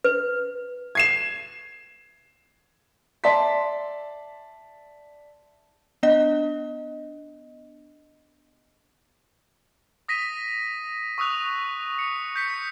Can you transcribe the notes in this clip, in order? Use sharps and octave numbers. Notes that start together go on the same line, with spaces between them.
B4
G#6 C7 E7
D5 E5 A5 C6 B6
B3 D4 D#5
D#6 A#6 B6 D#7
C#6 D#6 E6 F#6 F7
C#7
G6 B6 C#7